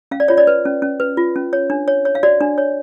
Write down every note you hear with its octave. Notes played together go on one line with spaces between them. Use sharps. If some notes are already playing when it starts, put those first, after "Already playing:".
C#4 F5
D5
F4 C#5
D5
B4
C#4
C#4
B4
F4
C#4
C#5
D4
C#5
C#5
F5
F#4 D5
D4
C#5